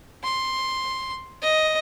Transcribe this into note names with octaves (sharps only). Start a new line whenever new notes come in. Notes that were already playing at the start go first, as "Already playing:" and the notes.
C6
D#5